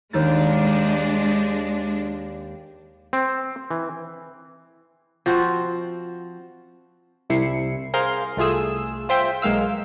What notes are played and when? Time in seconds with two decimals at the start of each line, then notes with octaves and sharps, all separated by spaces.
0.13 D#2 G#3 D4 A6
3.13 C4
3.71 E3
5.26 F3 C4 F#4
7.30 C2 C3 E4 C7 C#7
7.94 G#4 A#4 C5 F5 C6
8.37 C2 A3 F4 G#4 E6
9.09 F4 C5 E5 G5
9.42 B1 G#3 A#3 F5 E6